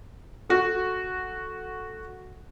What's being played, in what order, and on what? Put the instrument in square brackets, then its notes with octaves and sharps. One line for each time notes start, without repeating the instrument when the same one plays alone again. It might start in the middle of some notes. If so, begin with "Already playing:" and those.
[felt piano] F#4 A4